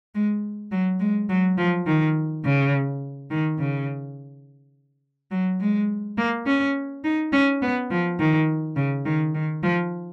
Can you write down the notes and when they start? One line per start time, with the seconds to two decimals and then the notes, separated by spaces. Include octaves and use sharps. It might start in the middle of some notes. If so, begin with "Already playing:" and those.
0.15 G#3
0.71 F#3
1.00 G#3
1.29 F#3
1.58 F3
1.87 D#3
2.45 C#3
3.31 D#3
3.59 C#3
5.32 F#3
5.60 G#3
6.18 A#3
6.46 C#4
7.04 D#4
7.33 C#4
7.62 B3
7.91 F3
8.19 D#3
8.76 C#3
9.05 D#3
9.34 D#3
9.63 F3